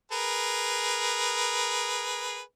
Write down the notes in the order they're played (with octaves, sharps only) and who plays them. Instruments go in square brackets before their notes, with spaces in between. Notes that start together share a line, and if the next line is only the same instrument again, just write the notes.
[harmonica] G#4 A#4 B4